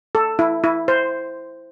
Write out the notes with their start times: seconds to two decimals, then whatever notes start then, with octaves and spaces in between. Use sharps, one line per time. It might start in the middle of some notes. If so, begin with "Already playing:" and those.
0.15 A4
0.39 E4
0.64 E4
0.88 C5